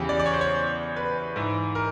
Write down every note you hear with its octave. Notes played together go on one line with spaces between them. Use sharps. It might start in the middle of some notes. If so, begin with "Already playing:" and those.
Already playing: E2 C#3 E3 G4
D5
D5
C#5
C5
C#5
B4
G#2 E3
A#4